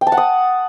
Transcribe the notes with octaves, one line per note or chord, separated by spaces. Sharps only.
G5
A5
F#5
D#6